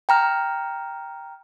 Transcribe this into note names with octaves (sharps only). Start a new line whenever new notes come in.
G5 A#5 F6